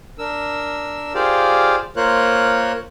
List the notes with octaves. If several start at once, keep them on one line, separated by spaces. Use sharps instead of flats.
D4 A#4 E6
F4 G4 G#4 C5 D5 F5
A#3 F4 A#4 C5 C#5 F#6